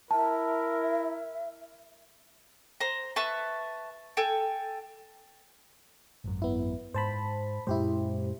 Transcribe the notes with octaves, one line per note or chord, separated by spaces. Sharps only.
E4 A#4 E5 A5
C5 A#5
B4 E5 A5 C#6
A4 G5 G#5
G#1 F#2
B3 E4
G#2 C5 A5 B5
F#2 A#2 G#3 E4 G4 C5